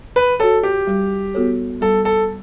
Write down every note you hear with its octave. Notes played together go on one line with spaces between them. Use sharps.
B4
F#4 A4 C#5
G4
G3
B3 F#4 A4 C#5
G3 A4
A4